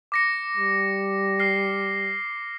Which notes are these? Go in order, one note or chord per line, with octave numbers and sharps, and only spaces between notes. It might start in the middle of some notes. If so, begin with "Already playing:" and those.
D6 A#6 C#7
G3
F6 C7